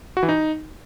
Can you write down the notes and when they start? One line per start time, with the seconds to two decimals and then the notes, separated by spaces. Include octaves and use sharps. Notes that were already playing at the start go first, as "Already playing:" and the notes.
0.17 F#4
0.23 E3
0.29 D#4